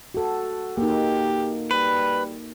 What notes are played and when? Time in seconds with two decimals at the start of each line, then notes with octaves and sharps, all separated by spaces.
0.14 F#4 A4
0.78 A#3 D#4 G4
1.71 G3 B4